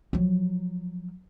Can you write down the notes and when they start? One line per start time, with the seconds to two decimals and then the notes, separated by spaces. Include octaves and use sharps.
0.13 F3 F#3